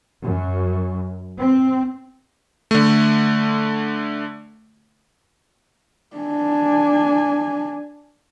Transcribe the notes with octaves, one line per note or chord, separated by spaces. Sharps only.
F#2
C4
D3 A3
D4 G#5